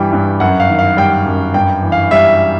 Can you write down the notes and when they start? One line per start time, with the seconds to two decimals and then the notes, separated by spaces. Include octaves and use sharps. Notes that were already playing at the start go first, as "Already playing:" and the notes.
Already playing: G2 E3 G3 G5
0.13 G2
0.40 F#2 F#5
0.60 F5
0.69 D#3
0.79 F5
0.97 G3 G5
1.26 F#2
1.54 G2 G5
1.83 E3
1.92 F5
2.11 G3 E5